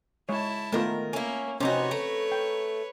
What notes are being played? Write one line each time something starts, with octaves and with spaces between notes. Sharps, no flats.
G#3 E4 C#5 A5
D#3 A3 B3 F4 A#4
A#3 C#4 E4
C3 C4 C#4 D#4 F#4 B4 C#5
A3 A#5
G5